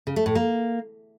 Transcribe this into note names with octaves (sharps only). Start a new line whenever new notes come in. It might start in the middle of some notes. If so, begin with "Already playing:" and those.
C#3
A3
A2
A#3